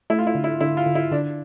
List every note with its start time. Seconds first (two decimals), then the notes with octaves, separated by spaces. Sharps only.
0.10 A3 E4
0.18 F4
0.27 E4
0.35 D3
0.44 E4
0.60 D3 E4
0.77 F4
0.86 D3
0.95 E4
1.12 D3 D4